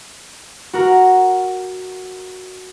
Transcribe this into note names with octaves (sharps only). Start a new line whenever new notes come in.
F#4 A#4